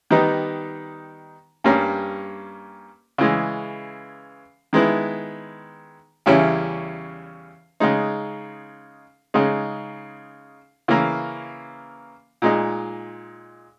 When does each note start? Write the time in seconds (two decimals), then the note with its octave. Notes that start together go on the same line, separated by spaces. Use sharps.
0.11 D#3 G3 B3 D#4
1.64 G2 G3 A#3 C#4
3.18 C#3 E3 G#3
4.73 D#3 G#3 B3 E4
6.26 E2 C#3 G3 C#4 E4
7.80 C#3 G#3 D#4
9.34 C#3 G#3 D#4
10.88 C#3 E3 A#3
12.42 A#2 G#3 D#4